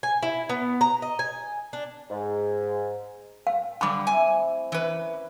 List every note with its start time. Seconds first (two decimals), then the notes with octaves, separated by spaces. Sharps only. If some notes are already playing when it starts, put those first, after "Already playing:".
0.03 G#5
0.23 E4
0.49 B3
0.81 A#5
1.02 D#5
1.19 G#5
1.73 D4
2.10 G#2
3.47 F5
3.81 D3 G3 B5 D6
4.07 A3 C4 E4 G#5
4.72 E3 C#4 E4 A#4 B4